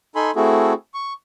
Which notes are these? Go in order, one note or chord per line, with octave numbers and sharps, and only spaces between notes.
D#4 A4 G#5 B5 C6
A3 C4 E4 F#4 G#4 A4
C#6